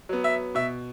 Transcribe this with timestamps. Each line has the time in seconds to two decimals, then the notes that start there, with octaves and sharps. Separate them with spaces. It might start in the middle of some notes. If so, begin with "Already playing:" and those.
0.09 F#3 B3
0.24 E5
0.55 B2 E5